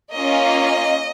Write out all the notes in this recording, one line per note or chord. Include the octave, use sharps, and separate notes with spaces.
A#3 C#4 F4 D#5